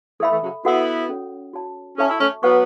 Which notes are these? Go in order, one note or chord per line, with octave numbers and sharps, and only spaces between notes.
E3 A3 A4 E5 B5
E3 A3
C#3 F#3
B3 E4 F#4 A4 F#5
C#4 A4 C#5
F#4 C#5 A5
C#4 A4 E5 A5 C#6
E4
A3 C#4
F#3 B3 B4 F#5 C#6